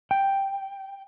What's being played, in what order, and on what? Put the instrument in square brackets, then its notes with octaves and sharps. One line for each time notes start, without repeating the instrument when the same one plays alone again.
[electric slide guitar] G5